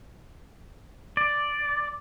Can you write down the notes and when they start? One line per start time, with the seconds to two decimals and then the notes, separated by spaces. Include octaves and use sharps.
1.17 D5